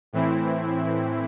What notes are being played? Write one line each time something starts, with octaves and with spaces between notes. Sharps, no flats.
A2 E3 C4 E4